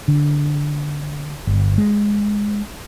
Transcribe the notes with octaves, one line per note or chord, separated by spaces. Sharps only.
D3
G1
G#3